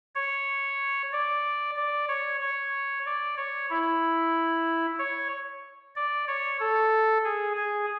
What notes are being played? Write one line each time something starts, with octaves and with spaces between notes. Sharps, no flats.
C#5
D5
D5
C#5
C#5
D5
C#5
E4
C#5
D5
C#5
A4
G#4
G#4